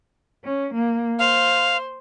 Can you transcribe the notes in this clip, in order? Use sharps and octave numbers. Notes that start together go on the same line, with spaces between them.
C#4
A#3
C5 F5